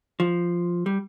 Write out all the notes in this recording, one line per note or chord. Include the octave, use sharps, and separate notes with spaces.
F3
G3